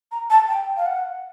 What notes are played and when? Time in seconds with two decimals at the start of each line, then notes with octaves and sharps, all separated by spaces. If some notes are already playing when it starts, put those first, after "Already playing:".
0.12 A#5
0.30 A5
0.48 G5
0.77 F5
0.86 F#5